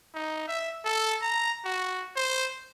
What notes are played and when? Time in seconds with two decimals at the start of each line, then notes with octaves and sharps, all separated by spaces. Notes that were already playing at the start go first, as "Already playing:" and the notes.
0.15 D#4
0.48 E5
0.85 A4
1.22 A#5
1.65 F#4
2.16 C5